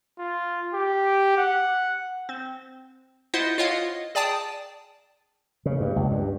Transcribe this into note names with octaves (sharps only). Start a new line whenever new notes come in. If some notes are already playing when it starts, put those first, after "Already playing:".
F4
G4
F#5
C4
E4 F4 C5 D#5 F#5
F4 C#5 D#5 F5 F#5
G#4 D5 G5 A5 D#6
C#3
G2
C#2
G2